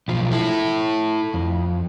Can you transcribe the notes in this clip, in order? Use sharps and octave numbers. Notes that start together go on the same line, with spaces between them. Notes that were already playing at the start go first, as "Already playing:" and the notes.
B1 F3
E4 A4
F2